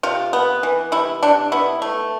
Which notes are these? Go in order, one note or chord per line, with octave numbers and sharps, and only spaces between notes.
C3 F4
B3
E3
C3 E4
C3 D4
B3 E4
A3